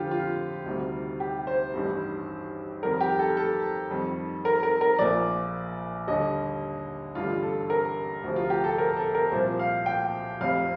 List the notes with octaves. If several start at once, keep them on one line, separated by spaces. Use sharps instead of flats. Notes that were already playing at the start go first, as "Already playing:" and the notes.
Already playing: F2 D3 F3 F4 G4
F4
D2 C3 D#3 G3
G4
C5
A1 G2 D#3 G3
F2 D#3 G3 A#4
G4
A4
A4
F2 D#3 G3
A#4
A#4
A#4
A#1 A#2 F3 D5
D#2 D3 G3 D#5
A1 G2 D3 G3 F4
A4
A#4
D2 C3 F3
F4
G4
A4
A#4
A4
A#4
C2 A#2 F3 C5
F5
G5
F1 F2 C3 F5